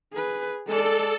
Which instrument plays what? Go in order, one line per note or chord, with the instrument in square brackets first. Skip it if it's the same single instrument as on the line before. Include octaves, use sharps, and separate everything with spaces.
[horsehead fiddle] G#4 B4
[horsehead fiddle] G#3 D5 [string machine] A4